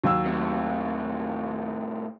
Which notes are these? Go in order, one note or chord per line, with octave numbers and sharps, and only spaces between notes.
D#2 F#3 E6
A2 C3